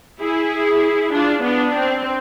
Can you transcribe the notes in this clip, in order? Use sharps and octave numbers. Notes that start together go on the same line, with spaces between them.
E4 G#4
D4 F4
B3 D4
C4